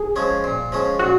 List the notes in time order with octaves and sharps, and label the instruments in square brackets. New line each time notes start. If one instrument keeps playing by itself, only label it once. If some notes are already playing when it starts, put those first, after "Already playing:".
Already playing: [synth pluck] G#4
[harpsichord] F3 G#3 C#4
A#2
F3 G#3 C#4
[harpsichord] A#2 [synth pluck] F#4